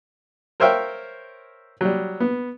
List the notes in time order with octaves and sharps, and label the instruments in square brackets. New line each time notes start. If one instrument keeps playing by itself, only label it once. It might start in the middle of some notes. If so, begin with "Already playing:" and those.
[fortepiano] A#4 C5 C#5 E5 F5 G5
F#3 G3
B3